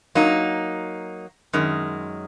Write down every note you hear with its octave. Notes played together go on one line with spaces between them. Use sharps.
F#3 A#3 D#4
F#2 D#3 G#3